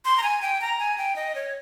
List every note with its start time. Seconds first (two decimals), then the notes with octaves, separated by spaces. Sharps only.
0.05 C6
0.17 A#5
0.23 G#5
0.42 G5
0.61 A#5
0.79 G#5
0.98 G5
1.16 D#5
1.35 C#5